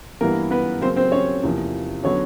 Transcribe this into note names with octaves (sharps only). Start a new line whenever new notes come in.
G2 E3 G3 A#3 B3 A#4
B3 B4
C#3 F#3 A#3 C4 C5
C4 C5
C#4 C#5
E2 C3 F3 A#3
D3 F#3 B3 C#4 C#5